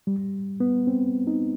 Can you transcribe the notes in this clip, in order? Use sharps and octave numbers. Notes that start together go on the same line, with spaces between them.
G3
B3
C4
D#4